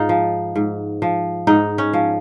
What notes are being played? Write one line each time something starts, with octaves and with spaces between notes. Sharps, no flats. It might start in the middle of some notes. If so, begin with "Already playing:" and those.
Already playing: G#2 D#4 F4
F3
G#2
F3
G#2 D#4
C#4
F3